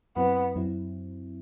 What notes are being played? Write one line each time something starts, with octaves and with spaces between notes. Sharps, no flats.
F#2 F#3 B3 C4 E4
F#2 F#3 C4 E4